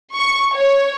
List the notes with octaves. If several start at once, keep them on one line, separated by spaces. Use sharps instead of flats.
C#6
C#5